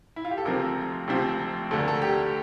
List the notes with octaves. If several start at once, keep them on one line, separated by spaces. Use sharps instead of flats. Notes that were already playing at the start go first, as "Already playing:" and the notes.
E4
F4
G4
A4
D2 C3 F3 C4 A#4
D2 C3 F3 C4
D2 D3 A3 A4
A#4
A4
G4